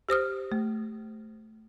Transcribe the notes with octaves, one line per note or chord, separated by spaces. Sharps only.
G4 C5 D#6 F6
A3